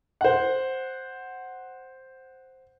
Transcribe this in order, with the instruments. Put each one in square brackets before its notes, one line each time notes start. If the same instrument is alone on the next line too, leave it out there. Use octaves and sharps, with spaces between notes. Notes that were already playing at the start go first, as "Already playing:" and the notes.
[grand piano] C5 F#5